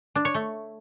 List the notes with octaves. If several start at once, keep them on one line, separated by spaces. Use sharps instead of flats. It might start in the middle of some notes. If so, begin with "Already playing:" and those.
D4
C#5
A3